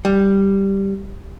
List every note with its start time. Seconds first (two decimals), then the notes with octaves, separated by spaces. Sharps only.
0.05 G3